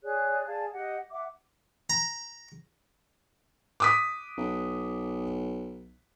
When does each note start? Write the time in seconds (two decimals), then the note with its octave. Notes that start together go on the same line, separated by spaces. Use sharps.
0.03 G#4 C#5 D5 F#6
0.46 G#4 D5 F5 A5
0.72 G4 D#5 F#5
1.11 E5 F#5 D6
1.90 A#5
3.80 D6 D#6 B6
4.38 B1